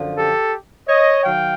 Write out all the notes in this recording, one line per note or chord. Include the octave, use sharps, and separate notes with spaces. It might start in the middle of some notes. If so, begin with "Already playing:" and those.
Already playing: F#2 D3 F3
G4 A4
C#5 D#5
D#3 F#3 F5 G5